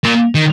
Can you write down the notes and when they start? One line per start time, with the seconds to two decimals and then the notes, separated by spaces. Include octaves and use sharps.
0.04 A#2
0.35 D#3